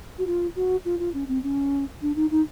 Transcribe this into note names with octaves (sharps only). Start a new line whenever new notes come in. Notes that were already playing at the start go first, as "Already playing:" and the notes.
F#4
F4
F#4
F4
F4
C#4
C4
C#4
D4
D#4
D#4